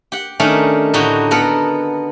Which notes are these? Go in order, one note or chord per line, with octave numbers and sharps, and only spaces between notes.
G4 F#5
D#3 A3 C#4 D4
A2 D3 D#4 F#4 G4
B3 A4 A#4 F#5